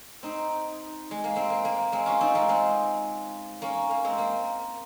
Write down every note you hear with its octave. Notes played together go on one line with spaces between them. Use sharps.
C4 D#4
G#3
A#3
G#3 C4
A#3
A#3
G#3 C4
C#4 F4
C4 D#4
G#3 C4
G#3 C4
A#3 C#4
A#3
G#3 C4
A#3